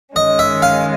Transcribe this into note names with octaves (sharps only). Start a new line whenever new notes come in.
D#3 G#3 C#4 D#5
E5
F5